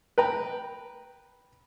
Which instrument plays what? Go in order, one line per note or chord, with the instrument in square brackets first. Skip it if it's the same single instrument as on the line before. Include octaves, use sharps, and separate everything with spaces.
[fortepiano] B4 G5 A#5